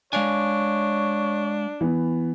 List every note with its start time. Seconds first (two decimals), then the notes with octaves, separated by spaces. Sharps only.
0.13 G#3 D4 C#5 F5 G#5
1.81 E3 B3